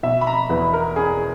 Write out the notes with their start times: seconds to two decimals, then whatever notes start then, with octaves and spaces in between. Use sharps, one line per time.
0.03 B2 E5
0.21 B5
0.27 A#5
0.49 E2 B4
0.73 A#4
0.96 C#4 G#4